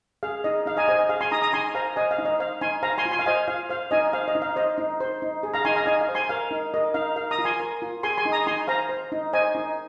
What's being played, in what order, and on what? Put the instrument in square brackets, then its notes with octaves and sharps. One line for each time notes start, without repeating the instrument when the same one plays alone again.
[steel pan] G#4 F5
D#4 D#5
D#4 F5
D#5 G#5
C5 D#5 G#5
D#5
G#4 F5
G#5 C6
D#4 A#5 D#6
A#5 D#6
D#4 G#5 C6
C5 F5 A#5
C5 D#5 G#5
F5
D#4
D#5
C5 F5
D#4 G#5 C6
C5 F5 A#5
G#5 C6
F4
G#5 C6
F5
C5 D#5 G#5
F4 F5
C5 F5
D#4 D#5 G#5
C5 F5
D#5
D#4
F5
C5 D#5
D#4
C5
D#4
G#4
F5 A#5
D#4 G#5 C6
F5 A#5
D#4 D#5 G#5
F5
C5
G#5 C6
A#4 F5
D#4
A#4 D#5
D#4 F5
A#4 F5
A#5 D#6
F4
G#5 C6
A#4
F4
G#4 G#5 C6
G#5 C6
D#4
A#5 D#6
D#4 G#5 C6
C5 F5 A#5
C5
D#4
C5 D#5 G#5
D#4